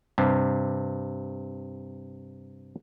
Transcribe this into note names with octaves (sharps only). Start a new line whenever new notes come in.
G2 C3